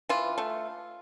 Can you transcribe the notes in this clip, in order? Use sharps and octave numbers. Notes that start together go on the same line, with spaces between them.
E3 F4
A3